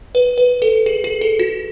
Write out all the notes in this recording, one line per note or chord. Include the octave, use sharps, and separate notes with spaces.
B4
B4
A4
G#4
G#4
A4
F#4